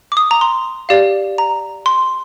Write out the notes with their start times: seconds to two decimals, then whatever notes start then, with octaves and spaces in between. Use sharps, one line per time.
0.12 D6
0.17 D#6
0.31 A#5
0.41 C6
0.89 G4 D5 F5
1.38 A#5
1.86 C6